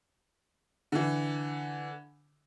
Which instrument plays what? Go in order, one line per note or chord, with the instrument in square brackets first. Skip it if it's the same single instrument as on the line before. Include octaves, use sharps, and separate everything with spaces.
[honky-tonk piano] D3 E3